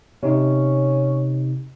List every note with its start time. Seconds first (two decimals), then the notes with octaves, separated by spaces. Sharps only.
0.23 C3 C#4 D#4